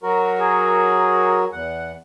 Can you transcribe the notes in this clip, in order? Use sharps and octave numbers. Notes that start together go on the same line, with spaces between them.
F#3 F#4 A#4
G#4
E2 F#5